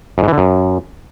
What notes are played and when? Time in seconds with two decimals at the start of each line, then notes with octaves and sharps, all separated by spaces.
0.18 F#2
0.23 G#2
0.28 E3
0.33 D3
0.38 F#2